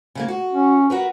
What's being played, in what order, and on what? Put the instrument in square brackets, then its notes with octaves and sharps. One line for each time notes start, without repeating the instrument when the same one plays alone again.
[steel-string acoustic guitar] C#3 A3 A#3
F#4
[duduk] C#4
[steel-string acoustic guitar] F#4 A#4 B4